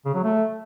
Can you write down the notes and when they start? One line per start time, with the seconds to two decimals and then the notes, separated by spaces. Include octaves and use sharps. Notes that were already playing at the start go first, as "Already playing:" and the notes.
0.05 C#3
0.14 F#3
0.24 A3